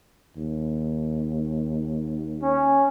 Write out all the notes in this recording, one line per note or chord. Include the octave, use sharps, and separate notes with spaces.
D#2
C#4